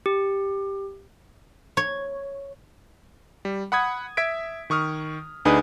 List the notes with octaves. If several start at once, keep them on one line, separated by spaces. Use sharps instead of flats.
G4
C#5
G3
F#5 B5 D#6 G#6
E5 G#6 B6 D7
D#3 C#6 D#6 F6
D2 D4 D#4 G#4 B4 D#6